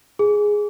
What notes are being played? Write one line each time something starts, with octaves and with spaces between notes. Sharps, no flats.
G#4